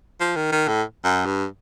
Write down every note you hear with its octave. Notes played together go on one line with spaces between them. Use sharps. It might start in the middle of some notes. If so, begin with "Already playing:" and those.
F3
D#3
D#3
A2
F#2
G2